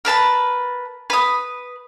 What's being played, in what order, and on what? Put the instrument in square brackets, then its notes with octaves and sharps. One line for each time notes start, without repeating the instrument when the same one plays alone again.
[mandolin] A#4 B4 A5 B5
B4 D#6